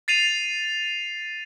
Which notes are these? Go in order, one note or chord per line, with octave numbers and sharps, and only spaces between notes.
A6 C7 D#7 F7